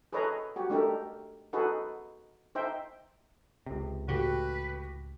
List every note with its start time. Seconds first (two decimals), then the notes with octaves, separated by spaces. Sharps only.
0.13 G#4 A4 B4 C#5 D#5 A#5
0.56 F#4 G4
0.70 A3 D4 D#4 G4 A4 A#4
1.53 D#4 F#4 G#4 A4 B4
2.55 D#4 C5 E5 G5
3.66 C#2 C3
4.08 A2 C#3 F#4 G4 B4